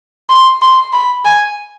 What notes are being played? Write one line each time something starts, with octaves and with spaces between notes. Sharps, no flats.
C6
C6
B5
G#5